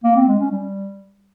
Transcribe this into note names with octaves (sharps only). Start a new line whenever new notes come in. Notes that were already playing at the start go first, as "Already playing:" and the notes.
A#3
C4
G#3
C#4
G3